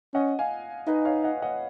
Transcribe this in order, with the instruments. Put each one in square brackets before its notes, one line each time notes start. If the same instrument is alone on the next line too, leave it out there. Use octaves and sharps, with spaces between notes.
[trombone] C#4 [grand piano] D#5 F#5
[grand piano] F5 G#5
[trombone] D#4 [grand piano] B4 D#5
[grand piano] C#5 F5
D#5 F#5
D#5 F#5